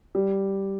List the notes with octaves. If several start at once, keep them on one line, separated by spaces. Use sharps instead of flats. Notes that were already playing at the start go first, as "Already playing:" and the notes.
G3